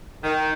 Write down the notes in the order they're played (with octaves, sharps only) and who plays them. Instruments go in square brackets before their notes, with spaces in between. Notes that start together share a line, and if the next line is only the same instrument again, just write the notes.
[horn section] D#3